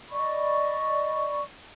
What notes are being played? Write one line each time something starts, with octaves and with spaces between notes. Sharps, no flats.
D5 D#5 B5 C#6